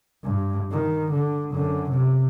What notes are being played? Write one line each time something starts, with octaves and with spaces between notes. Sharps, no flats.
G2
D#3
D3
F#2 D3
C3